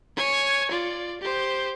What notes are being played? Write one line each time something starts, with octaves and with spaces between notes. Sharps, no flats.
C#5 G#5
F4 D5
G4 C5